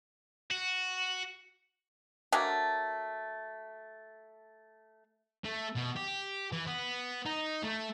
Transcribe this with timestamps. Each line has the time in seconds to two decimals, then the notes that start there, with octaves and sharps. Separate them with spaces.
0.51 F#4
2.32 F#3 A3 A#3 D4
5.44 A3
5.75 B2
5.96 G4
6.52 E3
6.67 B3
7.26 D#4
7.63 A3